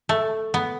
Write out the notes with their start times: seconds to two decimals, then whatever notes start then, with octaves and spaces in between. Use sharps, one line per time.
0.09 A3
0.54 B3